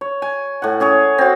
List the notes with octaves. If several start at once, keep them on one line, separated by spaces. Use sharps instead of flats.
C#5
G#5
A2 F#5
C#4 G#4 C#5
C4 F#4